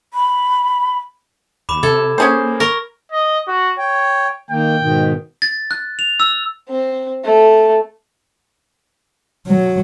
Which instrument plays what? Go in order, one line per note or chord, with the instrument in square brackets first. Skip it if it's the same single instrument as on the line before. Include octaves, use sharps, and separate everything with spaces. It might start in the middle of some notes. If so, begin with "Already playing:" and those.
[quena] B5
[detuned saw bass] D#2 [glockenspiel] B5 D6 E7
[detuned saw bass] C3 [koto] A4 [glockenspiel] G#6
[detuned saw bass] A#3 [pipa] C#4 G#4 C5
[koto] A#4 [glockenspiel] C#6 A#6
[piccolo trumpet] D#5
F#4
[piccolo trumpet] C#5 [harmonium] G5
[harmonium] D#3 A#3 [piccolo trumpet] G5
[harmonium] G#2 B2 D#3
[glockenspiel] A6
F#6
F7
E6
[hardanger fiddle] C4
A3
[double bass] F#3